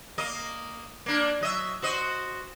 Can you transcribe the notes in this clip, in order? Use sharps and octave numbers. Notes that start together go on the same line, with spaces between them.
A#3 D#5
A#3 D4
F#3 D#5 E5
F#4 C5 D#5